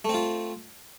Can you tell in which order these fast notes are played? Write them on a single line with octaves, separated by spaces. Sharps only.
A3 C4 F4